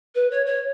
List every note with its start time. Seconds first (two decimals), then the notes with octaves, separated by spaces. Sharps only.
0.15 B4
0.31 C#5
0.46 C#5